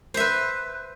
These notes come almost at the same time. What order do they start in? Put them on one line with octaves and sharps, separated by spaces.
C5 E5 B4